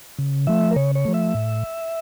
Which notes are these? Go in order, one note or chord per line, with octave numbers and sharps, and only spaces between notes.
C#3
F3 A3 E5
A#4
C#3 C#5
C#5
F3 A3
E5
A2